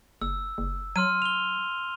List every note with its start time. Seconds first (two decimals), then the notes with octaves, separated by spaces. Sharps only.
0.22 F#1 E6
0.58 F#1
0.96 F#3 C6 F6 D#7
1.22 F7 G7